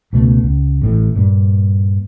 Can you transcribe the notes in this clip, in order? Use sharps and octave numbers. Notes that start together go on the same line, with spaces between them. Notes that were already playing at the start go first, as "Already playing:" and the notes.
C#2 B2 G3 A3
C#2
A1 A2 E3
G2 A#2